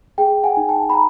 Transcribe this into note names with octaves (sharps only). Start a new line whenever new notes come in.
G#4 G5
F#5 G#5
D#4
G5 A5
B5
A#5